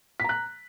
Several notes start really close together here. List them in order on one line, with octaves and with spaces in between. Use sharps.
B6 A#5 F#6